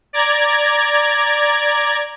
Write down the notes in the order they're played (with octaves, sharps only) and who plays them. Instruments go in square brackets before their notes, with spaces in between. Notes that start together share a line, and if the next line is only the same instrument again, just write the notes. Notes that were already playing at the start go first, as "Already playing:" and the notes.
[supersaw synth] D5 A#5 G#6